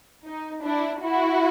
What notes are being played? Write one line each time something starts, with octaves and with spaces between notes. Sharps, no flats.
D#4
D4 E4
E4 F#4